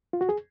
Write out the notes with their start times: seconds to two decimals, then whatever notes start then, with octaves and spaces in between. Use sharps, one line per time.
0.13 F4
0.21 F#4
0.29 G#4